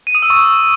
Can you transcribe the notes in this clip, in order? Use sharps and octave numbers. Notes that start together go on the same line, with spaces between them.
D#7
D#6
E6
C#6